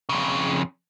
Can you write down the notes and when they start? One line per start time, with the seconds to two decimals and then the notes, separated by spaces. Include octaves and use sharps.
0.09 F2 C#3